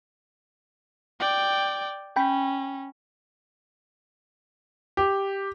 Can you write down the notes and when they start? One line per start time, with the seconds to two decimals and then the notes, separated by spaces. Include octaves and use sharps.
1.20 D5 G5
2.16 C#4 G5 B5
4.97 G4